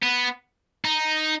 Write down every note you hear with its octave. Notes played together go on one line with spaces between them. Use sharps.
B3
D#4